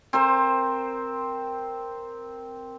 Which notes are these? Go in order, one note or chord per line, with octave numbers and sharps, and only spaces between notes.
C4 A#4 C5